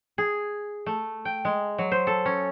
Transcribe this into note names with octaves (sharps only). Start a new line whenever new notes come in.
G#4
A3
G5
G#3
F#3
C5
A4
C#4